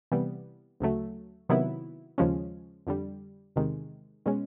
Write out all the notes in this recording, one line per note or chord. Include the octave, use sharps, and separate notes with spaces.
C3 E3 G3 B3
D2 C#3 F#3 A3
C3 D#3 F#3 B3 E4
D#2 C#3 F3 G#3 C#4
F2 D3 G3
E2 C3 D#3 G#3
B2 G#3 C#4